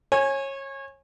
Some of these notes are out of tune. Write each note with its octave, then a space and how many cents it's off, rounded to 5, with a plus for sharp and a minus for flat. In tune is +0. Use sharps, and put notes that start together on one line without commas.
C#5 -25 G#5 +0